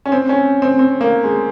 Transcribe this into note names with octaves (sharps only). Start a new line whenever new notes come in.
C#4
C4
C#4
C4
C4
A#3
G#3